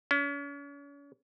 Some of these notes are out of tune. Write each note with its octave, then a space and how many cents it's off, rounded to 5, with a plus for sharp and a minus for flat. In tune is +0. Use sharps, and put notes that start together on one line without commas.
C#4 +40